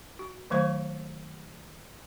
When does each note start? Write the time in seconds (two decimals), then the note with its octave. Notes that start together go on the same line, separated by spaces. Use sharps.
0.19 F#4
0.50 D#3 F#3 A3 C5 C#6